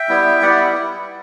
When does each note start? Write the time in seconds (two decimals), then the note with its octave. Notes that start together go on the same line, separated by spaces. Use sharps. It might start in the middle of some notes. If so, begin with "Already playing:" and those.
Already playing: E5 G5
0.09 G3 B3 E4
0.42 G3 B3 E4 D5 F#5